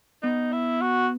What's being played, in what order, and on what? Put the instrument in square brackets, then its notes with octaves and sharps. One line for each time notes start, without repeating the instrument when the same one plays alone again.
[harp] B3 [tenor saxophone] D#4
[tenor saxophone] E4
F#4